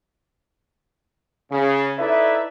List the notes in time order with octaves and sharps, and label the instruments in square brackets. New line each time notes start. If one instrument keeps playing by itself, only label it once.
[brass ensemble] C#3
D#4 E4 A4 B4 D5 E5